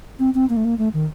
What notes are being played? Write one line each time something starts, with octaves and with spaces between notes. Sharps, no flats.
C4
C4
A#3
A3
A#3
A3
D#3